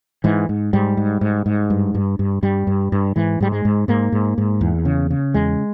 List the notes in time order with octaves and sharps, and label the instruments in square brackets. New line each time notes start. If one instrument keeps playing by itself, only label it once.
[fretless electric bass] G#2 E3
G#2
G#2 G3
G#2
G#2
G#2
G2
G2
G2
G2 G3
G2
G2
G#2 E3
G#2 G3
G#3
G#2
G#2 A#3
G#2
G#2
E2
C#3
C#3
E2 G#3